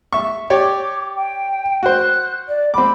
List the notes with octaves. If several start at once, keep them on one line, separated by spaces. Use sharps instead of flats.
E5 C#6
G4 C#5 D5 D6
G5
F#4 C5 F#6
D5
C4 B5 D6